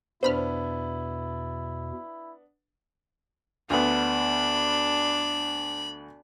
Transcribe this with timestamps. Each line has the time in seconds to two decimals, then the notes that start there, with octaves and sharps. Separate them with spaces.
0.23 E2 B2 B3 D4 E4 C5 B5 F6
3.70 D2 B3 D4 B5